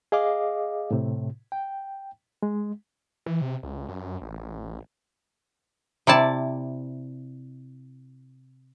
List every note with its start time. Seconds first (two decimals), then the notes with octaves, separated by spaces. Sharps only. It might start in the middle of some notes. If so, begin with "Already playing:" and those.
0.12 G#4 D#5 F5 D6
0.91 A2 C3
1.52 G5
2.42 G#3
3.26 E3
3.41 C3
3.63 C#2
3.89 F#2
4.22 A1
6.07 C3 E4 D5 A5